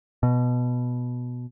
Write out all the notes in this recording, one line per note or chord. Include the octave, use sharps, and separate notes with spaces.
B2